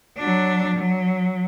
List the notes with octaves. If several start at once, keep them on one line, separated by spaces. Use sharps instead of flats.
F#3 D4
F#3